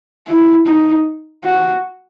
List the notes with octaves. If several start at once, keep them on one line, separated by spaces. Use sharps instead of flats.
E4
D#4
F#4